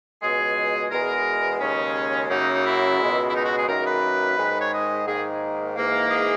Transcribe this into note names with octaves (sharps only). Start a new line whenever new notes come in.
C#2 B2 G#3 G#4
E2 B2 G#3 A#4
D#2 C#3 G#3 C#4
F#2 C#3 F#3 A#3 D#4
D#4
E4
C#2 B2 G#3
E4
D#4
F#4
G#4
F#2 D#3 A#3 A#4
B4
G#2 D#3 G#3
C#5
D#5
G#2 D#3 A#3 G#4
G#2 E3 A#3
G#4